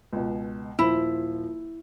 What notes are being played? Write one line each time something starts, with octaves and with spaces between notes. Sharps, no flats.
C#2 B2
D#1 F3 E4 C5